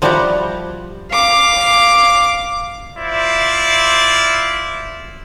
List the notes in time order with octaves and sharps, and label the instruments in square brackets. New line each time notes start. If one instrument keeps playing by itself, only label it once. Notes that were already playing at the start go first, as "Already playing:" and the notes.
[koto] F3 G3 E4 F#4 G4 A#5
[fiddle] F5 D6
[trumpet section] E4 F4 C5 D5